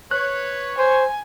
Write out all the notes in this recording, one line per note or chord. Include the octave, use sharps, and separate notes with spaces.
B4 C#5 F#6
C5 G#5